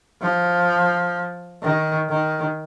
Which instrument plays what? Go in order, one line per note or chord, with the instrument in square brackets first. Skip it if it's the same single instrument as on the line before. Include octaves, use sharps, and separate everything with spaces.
[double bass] F3
D#3
D#3